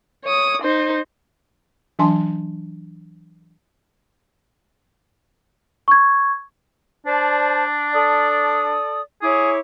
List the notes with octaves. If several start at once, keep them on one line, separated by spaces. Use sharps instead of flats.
C#5 D#6
D#4 C5
E3 F#3 D4 G#5 A5 C6
C#6 G#6
D4 C5 D5 A5
A4 D5 D#6
E4 G#4 C#5 D6